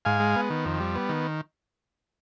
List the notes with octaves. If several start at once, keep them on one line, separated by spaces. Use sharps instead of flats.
G#2 F5 G#5
G#3
B3
D#3
F2
G3
B3
D#3